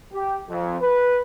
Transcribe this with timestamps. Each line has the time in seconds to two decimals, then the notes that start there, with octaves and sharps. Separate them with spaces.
0.13 G4
0.49 F2
0.81 B4